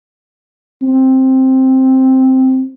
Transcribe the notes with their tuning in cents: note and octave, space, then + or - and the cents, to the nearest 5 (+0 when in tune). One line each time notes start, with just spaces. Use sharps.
C4 +5